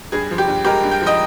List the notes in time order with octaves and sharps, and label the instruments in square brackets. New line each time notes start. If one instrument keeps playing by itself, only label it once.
[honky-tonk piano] G2 G#4
F3
G4
G2
G#3 G4 A#4
G2
G5
F3
D#5 G5